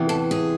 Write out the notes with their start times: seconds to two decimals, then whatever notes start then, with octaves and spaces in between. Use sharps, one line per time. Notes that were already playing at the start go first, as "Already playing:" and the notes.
Already playing: E2 C3 E3
0.09 A4
0.31 G#4